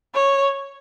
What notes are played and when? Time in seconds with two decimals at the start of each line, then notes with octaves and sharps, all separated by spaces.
0.15 C#5